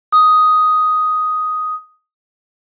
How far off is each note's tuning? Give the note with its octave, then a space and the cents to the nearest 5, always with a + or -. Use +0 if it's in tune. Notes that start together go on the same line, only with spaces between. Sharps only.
D#6 +5